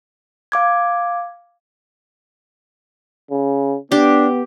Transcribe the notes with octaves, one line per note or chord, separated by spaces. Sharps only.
F5 D6 G#6
C#3
B3 D4 G4